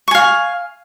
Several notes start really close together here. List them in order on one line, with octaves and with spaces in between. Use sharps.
C#6 G#5 F5